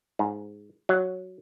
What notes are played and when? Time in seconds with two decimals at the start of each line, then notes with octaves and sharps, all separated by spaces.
0.19 G#2
0.89 F#3